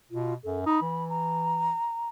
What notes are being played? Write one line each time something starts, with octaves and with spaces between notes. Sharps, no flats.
B2 F4
F#2 A4
D#4 B5
E3
A#5